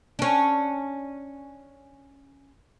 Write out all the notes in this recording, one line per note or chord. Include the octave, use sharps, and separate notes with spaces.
C#4 D4